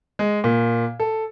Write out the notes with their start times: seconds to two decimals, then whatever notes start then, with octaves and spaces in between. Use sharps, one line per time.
0.19 G#3
0.44 A#2
1.00 A4